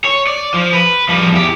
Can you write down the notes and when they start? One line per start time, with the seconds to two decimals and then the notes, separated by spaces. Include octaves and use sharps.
0.05 C#5
0.27 D5
0.54 F3
0.73 B4
1.09 F3 G3
1.32 E2 G4